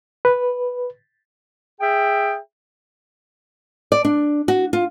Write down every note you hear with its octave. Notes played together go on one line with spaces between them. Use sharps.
B4
G#4 E5 G5
D5
D4
F#4
F4